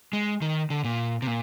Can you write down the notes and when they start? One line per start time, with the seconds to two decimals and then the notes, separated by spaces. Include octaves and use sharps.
0.13 G#3
0.42 D#3
0.70 D3
0.84 A#2
1.22 C3
1.27 A#2